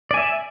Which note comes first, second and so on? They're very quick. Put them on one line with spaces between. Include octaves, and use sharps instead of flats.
D5 G#5 E5